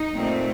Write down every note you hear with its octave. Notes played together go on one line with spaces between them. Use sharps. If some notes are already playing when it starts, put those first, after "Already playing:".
Already playing: D#4
A#2 A3 C4